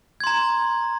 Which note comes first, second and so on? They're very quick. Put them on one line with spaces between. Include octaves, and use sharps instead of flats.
G#6 C6 A#5